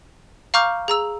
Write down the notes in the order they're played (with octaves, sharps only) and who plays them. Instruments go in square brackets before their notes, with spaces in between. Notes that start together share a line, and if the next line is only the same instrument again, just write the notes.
[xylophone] F5 A#5 C#6 D6 F6 G6
G#4 A#5 E6